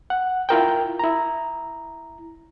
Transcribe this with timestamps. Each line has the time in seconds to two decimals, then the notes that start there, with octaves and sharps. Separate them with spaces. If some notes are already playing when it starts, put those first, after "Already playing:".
0.10 F#5
0.49 E4 F4 A#4 G5
0.99 E4 A#5